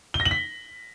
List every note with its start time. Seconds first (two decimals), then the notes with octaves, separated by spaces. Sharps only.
0.14 G7
0.20 A#6
0.25 F#7
0.31 B6